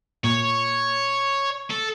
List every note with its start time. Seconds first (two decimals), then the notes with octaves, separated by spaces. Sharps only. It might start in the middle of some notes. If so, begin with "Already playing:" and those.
0.24 A#2 C#5
1.71 A4